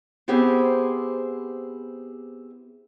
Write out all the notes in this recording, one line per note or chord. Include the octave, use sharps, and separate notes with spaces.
B3 C4 E4 G4 G#4 C5